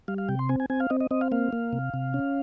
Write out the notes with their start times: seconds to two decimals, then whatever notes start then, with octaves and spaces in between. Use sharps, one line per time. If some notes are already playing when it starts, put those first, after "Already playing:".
0.08 G3 F5
0.18 F5
0.29 C3 G5
0.39 C6
0.49 C4 G#5
0.60 G#5
0.70 C4 G#5
0.80 F5
0.90 C4 D#5
1.01 D#5
1.11 C4 D#5
1.21 F5
1.32 A#3 F5
1.52 A#3
1.73 C3
1.94 C3
2.14 C#4